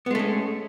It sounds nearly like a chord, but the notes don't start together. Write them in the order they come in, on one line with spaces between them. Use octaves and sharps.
B3 G#3 A3 C#4